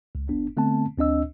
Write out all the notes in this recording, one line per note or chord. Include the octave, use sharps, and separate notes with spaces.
C#2
G1 B3 D4
D3 A3 B3 C4 A5
D2 C4 D4 D#5 E6